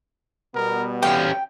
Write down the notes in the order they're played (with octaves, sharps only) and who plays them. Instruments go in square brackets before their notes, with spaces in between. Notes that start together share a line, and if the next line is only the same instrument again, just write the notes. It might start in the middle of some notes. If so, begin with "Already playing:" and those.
[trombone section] B2 G3 B3 [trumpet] A#4
[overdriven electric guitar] C#4 G4 [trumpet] F5 [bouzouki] G5